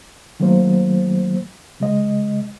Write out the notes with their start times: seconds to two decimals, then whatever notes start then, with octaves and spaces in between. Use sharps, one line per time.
0.40 D#3 F#3 A3 A#3 C5
1.80 C#3 G#3 D#5